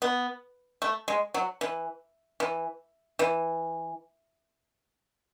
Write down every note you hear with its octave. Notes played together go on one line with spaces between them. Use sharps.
B3
A3
G#3
F#3
E3
E3
E3